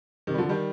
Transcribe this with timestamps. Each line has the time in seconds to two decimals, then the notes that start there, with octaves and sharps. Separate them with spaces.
0.27 C3 D#3
0.34 G3
0.38 D3 F3
0.49 D#3 G3